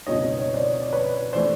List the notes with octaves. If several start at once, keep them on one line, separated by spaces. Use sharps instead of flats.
C#2 B2 G3 C4 D#4 C#5 D#5
C#5 D#5
C5 D5
C#5
D5
B4 C#5
E3 A3 C5 D5